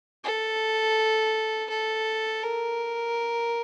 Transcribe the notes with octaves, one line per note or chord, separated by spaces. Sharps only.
A4
A4
A#4